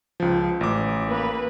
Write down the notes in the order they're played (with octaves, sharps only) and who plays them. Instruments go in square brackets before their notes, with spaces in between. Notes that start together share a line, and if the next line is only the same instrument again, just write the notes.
[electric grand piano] C#2 F3
A1 D6
[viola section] A#3 B4